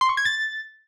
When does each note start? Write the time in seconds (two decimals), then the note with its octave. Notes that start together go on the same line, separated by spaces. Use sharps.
0.01 C6
0.09 C#6
0.17 G#6
0.25 A6